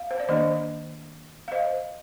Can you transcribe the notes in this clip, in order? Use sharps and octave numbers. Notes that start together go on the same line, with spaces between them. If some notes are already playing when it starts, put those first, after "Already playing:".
Already playing: F5
C5
D5
D#3 A#3 D4 C5 D#5
F5
C5 D#5